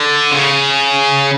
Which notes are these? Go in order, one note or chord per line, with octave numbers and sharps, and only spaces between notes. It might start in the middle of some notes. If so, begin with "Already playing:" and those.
Already playing: D3
C#3